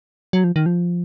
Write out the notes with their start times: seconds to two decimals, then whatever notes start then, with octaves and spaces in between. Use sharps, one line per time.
0.33 F#3
0.44 F3
0.56 D#3
0.66 F3